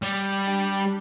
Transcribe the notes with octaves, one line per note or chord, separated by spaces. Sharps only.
G3
D4 G4